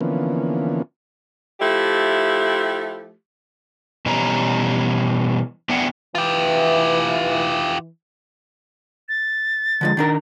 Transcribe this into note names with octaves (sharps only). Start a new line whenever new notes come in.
D3 E3 F3 A#3 B3 C#4
F3 A3 E4 G4
B2 E3 G3 C#4 A#5
B3 D4 E4 G#4 F#5 G5
E3 F4 G4
A6
D3 F3 G#3
D#3 D4 A#4